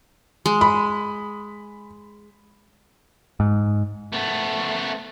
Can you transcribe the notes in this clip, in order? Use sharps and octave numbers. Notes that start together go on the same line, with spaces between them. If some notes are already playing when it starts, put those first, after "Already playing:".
G#3
B5
G#2
A3 B3